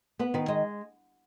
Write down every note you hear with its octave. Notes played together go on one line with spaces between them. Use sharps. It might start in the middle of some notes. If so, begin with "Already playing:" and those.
B3 B4
D#3 B4
G#3 D#5